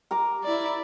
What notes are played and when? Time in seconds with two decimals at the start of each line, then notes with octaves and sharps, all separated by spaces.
0.11 A#4 A#5 D6
0.44 E4 D5